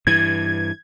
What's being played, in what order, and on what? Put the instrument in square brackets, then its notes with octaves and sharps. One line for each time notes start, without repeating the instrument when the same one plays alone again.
[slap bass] G2 E3 [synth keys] G#6